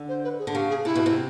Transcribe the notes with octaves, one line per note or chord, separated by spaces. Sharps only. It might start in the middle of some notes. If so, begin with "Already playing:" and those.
Already playing: D3
C5
B4
G#4
D3
C#3 G4
G#4
C3 E4
B2
C3